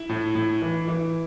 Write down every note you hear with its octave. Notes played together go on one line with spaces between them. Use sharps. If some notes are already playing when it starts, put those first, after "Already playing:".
Already playing: E4
A2
A2
E3
E3